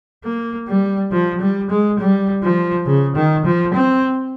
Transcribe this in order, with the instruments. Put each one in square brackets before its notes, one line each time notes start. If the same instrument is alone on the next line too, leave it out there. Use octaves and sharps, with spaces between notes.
[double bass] A#3
G3
F3
G3
G#3
G3
F3
C#3
D#3
F3
C4